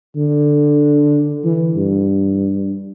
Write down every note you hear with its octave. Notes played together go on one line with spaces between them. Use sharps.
D3
E3
G2